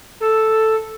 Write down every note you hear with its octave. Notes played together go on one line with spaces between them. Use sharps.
A4